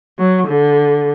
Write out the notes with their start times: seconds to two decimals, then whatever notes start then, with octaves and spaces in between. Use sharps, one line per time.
0.19 F#3
0.48 D3